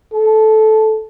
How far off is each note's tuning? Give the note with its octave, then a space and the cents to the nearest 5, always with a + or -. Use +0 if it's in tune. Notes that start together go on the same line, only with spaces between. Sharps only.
A4 -10